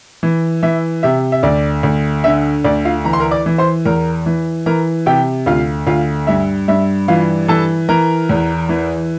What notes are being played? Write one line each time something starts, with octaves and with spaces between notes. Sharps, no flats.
E3
E3 E5
C3 E5
E5
D2 D5
D2
D3 E5
D2 D5
F4 F5
E3 A#5
C6
A#4 A#5
D5 D6
E3
C5 C6
E2 A#4 A#5
E3
E3 A#4 A#5
C3 G4 G5
D2 F4 F5
D2 F4 F5
G2 E5
G2 E5
E3 F4 F5
E3 A4 A5
E3 A#4 A#5
E2
E3